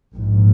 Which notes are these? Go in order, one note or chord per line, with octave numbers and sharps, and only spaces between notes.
A#1 G#2